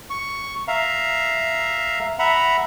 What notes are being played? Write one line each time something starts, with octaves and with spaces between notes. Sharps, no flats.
C#6
E5 F5 A#5
E5 F#5 A#5 B5